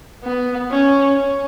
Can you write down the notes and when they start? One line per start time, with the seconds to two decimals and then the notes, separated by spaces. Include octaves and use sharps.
0.24 B3
0.71 C#4
1.16 C#4